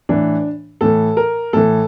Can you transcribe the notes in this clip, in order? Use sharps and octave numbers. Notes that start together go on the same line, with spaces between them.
A2 E3 D4
A2 E3 A4
A#4
A2 E3 A4